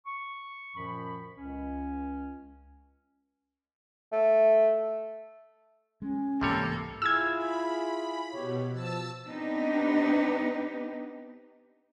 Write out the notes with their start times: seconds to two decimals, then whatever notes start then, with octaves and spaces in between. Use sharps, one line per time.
0.06 C#6
0.76 F#2 A#2 D#3 F3 B5
1.36 C#2 C#4
4.12 A3
6.02 G#3 C#4
6.41 C2 G#2 C3 E3 G3 A#3 A4 C#5
7.02 E4 F4 G#4 E6 F6 G#6
7.37 B5
8.33 B2 G4 C#5
8.73 F3 A5 E6
9.26 B3 C4 D4 D#4 G4 B4